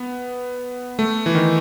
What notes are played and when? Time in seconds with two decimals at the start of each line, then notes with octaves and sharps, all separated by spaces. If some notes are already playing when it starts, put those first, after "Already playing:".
Already playing: B3
0.99 A3
1.26 E3
1.35 D#3